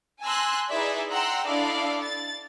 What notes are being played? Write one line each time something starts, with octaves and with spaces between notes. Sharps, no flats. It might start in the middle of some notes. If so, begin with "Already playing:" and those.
G#5 A5 C6 E6 F#6 A#6
D#4 E4 G#4 B4 D5 E5
F#5 G5 A#5 C6 E6 F#6
D4 E4 A4 D5 D#5 F5
A6